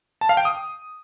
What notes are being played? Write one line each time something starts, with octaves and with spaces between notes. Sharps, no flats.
A5
F5
G5
D#6